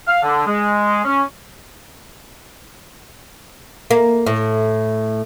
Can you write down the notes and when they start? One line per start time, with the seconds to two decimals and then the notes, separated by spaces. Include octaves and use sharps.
0.08 F5
0.23 D3
0.46 G#3
1.05 C#4
3.91 A#3
4.26 A2